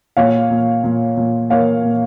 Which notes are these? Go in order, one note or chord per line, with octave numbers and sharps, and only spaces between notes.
A#2 C#5 F5
A#2
A#2
A#2
A#3 C#5 F5
A#2